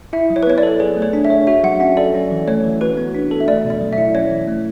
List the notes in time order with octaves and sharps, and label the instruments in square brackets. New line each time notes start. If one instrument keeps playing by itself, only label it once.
[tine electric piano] E4 [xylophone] E5
[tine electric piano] F#3
[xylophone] C#5
B4
[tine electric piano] B3 [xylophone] C#5
[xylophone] D5
[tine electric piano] A4
[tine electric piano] G#4 [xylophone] C#5
[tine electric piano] A3
[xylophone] C#5
[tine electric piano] D4
[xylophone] E5
[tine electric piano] C#5
[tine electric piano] F#4 [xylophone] E5
[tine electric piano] F#3 [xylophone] F#5
[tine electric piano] C#4 [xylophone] E5
[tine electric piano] A4 [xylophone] D5
[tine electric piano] C#4
E3
[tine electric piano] A3 [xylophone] C#5
[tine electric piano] E3
[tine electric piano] F#4 [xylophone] B4
[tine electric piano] B3
D4
A4
[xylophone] E5
[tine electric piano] A3 [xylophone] D5
[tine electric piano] B2
[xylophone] D5
[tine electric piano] F#3
[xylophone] E5
[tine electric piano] E4
[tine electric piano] C#4 [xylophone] C#5
[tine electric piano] E3
A3